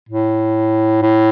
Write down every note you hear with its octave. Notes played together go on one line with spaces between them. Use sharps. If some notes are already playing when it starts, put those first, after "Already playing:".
A2
A2